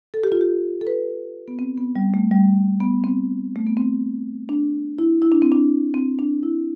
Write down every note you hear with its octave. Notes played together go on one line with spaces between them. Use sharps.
A4
G4
F4
G4
A4
B4
B3
C4
B3
G3
A3
G3
B3
C4
A3
B3
C4
D4
E4
E4
D4
C4
D4
C4
D4
E4